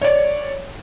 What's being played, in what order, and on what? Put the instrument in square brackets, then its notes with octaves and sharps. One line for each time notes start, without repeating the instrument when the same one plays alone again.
[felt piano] C#5 D5